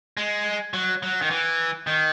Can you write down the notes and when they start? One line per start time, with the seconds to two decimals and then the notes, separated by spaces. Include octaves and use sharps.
0.17 G#3
0.74 F#3
1.03 F#3
1.22 D#3
1.31 E3
1.87 D#3